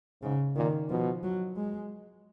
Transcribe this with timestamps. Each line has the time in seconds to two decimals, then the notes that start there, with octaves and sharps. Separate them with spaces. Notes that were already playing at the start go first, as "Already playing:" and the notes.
0.23 G#2 C#3
0.56 A#2 D#3
0.90 B2 F3
1.23 F#3
1.56 G#3